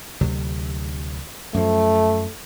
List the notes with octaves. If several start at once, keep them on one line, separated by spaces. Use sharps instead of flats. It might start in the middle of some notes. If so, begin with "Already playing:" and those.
D2 C3 F#3
F#2 F3 A3